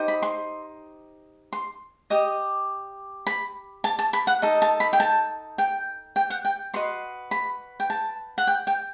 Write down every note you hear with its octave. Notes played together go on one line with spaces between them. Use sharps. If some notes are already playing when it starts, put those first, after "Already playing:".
Already playing: D#4 G4 C5 D#5
B5
C6
C6
G4 D#5 D#6
B5
A5
A5
B5
F#5
D#4 A4 D#5
A5
B5
G5
A5
G5
G5
F#5
G5
F#4 B4 D#5 C6
B5
G5
A5
F#5
G5
G5